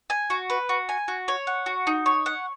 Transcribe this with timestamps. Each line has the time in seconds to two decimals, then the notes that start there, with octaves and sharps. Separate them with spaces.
0.10 G#5
0.30 F#4
0.50 B4
0.69 F#4
0.89 G#5
1.08 F#4
1.28 C#5
1.47 F#5
1.66 F#4
1.87 D#4
2.06 C#5
2.26 F#5